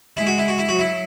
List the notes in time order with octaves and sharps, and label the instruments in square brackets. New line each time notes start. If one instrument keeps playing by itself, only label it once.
[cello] G#3 [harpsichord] E4
[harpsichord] F#4
E4
F#4
E4
[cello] F#3 [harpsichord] F#4
[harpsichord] E4